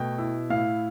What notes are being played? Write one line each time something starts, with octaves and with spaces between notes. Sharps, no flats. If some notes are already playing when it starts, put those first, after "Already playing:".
Already playing: B2 A3 G5
E4
A2 F5